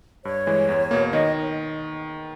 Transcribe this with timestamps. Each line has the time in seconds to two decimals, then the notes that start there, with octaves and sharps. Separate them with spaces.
0.25 G2 C#5
0.47 E3 G#3
0.69 E2
0.91 B2 A#3
1.13 D#3 D#5